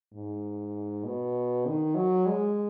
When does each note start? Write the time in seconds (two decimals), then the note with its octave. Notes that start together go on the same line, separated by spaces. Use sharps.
0.14 G#2
1.04 B2
1.66 D#3
1.95 F#3
2.26 G#3